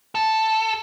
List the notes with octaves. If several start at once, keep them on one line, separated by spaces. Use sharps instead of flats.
A4